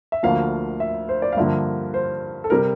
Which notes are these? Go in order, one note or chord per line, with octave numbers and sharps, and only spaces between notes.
E5
D2 D3 F3 A#3 F5
E5
C5
D5
F5
G2 D3 F3 A#3 E5
C5
A4
C3 G3 A#4